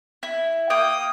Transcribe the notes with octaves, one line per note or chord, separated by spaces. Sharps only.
E4
A#3 G5 D#6